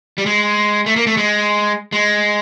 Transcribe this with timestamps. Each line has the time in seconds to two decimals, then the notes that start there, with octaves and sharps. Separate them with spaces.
0.18 G3
0.26 G#3
0.86 A3
0.96 A#3
1.07 A3
1.17 G#3
1.92 G#3